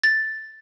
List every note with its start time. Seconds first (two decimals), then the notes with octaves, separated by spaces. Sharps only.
0.03 A6